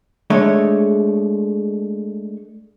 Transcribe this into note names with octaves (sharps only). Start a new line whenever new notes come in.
G#3 A3 D4 C#5